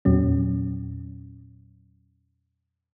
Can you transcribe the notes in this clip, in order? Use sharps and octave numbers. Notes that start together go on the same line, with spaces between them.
E2 A#2 F#3 C#4